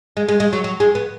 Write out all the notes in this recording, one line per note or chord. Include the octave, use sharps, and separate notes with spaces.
G#3
G#3
G#3
F#3
F#3
G#3
B3